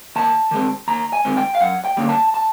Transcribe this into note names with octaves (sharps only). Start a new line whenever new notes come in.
D#2 A5
D#3 G#3 C4
D#2 A#5
G#5
D#3 G#3 C4
G5
F5
F#2 F#5
G5
D3 G3 A#3 C#4
A5
A5